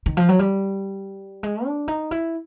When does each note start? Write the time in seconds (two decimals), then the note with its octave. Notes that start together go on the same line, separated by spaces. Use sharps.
0.06 D#3
0.17 F3
0.29 F#3
0.39 G3
1.43 G#3
1.65 D4
1.88 D#4
2.11 E4